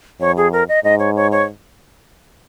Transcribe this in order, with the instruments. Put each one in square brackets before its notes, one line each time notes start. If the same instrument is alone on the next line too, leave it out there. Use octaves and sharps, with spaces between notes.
[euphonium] F2 [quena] C#5
[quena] G#4
A#4
D#5
[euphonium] G#2 [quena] D#5
[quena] C#5
C#5
C#5